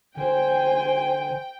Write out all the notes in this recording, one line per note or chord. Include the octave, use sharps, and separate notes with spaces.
D3 C5 G5 G#5